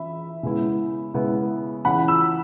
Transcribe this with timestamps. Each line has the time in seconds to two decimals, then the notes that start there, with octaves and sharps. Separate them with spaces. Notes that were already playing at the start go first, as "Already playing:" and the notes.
Already playing: E3 C#4 E4 E5 B5
0.43 C#3 G#3 B3 E4
1.14 C#3 G#3 B3 E4
1.85 C#3 E3 C#4 F#5 B5
2.08 B5 E6